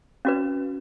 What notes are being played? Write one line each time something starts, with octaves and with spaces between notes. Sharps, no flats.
C#4 F#4 B4